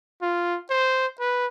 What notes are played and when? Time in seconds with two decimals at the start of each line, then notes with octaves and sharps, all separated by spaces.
0.22 F4
0.70 C5
1.20 B4